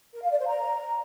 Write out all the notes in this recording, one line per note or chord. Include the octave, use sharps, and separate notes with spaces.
A#4
F5
D5
C5
A#5